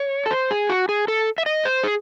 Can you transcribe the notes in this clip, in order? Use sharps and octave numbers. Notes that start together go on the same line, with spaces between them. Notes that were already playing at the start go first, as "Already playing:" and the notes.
Already playing: C#5
A4
C5
G#4
F#4
G#4
A4
E5
D#5
C5
G#4